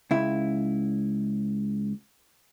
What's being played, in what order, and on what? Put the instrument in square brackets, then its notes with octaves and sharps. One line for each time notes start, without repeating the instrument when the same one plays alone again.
[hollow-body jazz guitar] C#2 E4